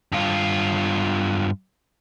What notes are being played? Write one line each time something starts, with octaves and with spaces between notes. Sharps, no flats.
G2 F4